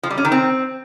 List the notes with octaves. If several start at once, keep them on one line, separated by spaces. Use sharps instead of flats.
F3
G3
C#4
D#3
C4